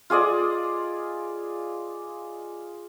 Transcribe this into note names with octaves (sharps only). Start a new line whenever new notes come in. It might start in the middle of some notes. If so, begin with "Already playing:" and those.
F4 G#4 D5 D#5